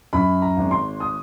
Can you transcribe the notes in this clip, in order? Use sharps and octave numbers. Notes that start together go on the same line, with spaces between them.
F#2 B5
A#5
G#1
C6
D#6